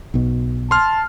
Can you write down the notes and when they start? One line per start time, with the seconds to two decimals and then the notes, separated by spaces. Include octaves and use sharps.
0.14 B1 B2
0.71 A5 C6 F6